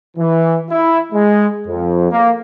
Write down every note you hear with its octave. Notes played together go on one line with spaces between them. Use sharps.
E3
E4
G#3
F2
A#3